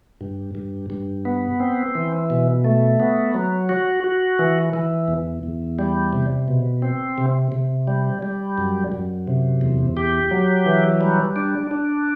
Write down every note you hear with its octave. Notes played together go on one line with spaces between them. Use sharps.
G2
G2
G2
B3
C4
E3
B2
A3
B3
F#3
F#4
F#4
E3
E3
E2
E2
G3
C3
B2
C4
C3
C3
G3
G3
F#2
F#2
C3
E2
G4
F#3
E3
G3
D4
D4